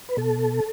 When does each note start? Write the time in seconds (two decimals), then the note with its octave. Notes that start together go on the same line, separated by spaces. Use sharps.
0.09 B4
0.17 B2 A4